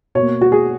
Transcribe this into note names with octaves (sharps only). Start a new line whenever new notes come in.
B2 A#3 C#5
F#4
G#4